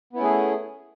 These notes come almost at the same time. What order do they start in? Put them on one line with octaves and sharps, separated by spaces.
B3 E4 C#4 A3 G#4